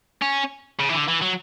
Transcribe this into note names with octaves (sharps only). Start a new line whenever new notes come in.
C#4
C#3
E3
D3
E3
F#3